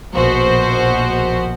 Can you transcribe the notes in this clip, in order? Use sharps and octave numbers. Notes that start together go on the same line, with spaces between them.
A#1 B2 F#4 C5